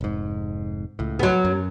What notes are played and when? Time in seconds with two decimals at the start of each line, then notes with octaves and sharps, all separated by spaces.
0.01 F1 G#2
0.99 C#2 A2
1.19 F#3 B3
1.45 F#2